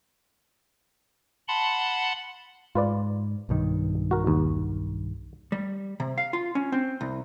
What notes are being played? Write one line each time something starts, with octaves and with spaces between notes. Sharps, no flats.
F#5 A5 B5 C6
G#2 F4 B4 D5
B1 G2 D#3
F#4 A#4
D#2
G3
C3
F5
F4
C#4
C4
C2